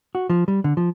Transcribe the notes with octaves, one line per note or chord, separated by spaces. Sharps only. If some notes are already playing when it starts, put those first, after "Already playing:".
F#4
F3
G3
D3
F3